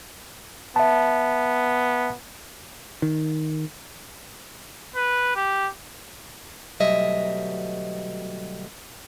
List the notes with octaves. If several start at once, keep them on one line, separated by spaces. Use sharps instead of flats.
B3 E5 A5
D#3
B4
G4
D2 B2 F#3 G3 D#5 E5